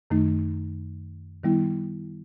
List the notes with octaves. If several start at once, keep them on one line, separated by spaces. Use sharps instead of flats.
F#2 D#3 A3 D#4
D#3 G3 B3 E4